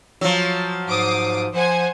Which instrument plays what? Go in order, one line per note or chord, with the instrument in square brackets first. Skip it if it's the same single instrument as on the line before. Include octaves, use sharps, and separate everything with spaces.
[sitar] F3 F#3
[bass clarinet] G#2 [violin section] D6 D#6 C7
[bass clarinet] F3 [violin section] C5 F#5 G#5